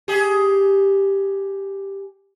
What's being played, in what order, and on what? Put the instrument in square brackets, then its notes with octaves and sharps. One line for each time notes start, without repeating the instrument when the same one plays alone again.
[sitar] G4 G#4